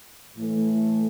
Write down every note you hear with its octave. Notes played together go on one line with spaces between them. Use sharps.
A2 E3 A3